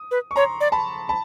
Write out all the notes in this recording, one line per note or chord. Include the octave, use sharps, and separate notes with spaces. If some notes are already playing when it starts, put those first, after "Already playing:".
Already playing: D#6
B4
C#6
C#5 A#5 C6
D5
A5 B5
A5 B5